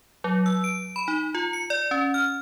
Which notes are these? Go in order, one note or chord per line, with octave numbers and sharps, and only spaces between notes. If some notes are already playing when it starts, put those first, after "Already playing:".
F#3
E6
D7
B5
D#4
F4
C#7
D5
C#4
F6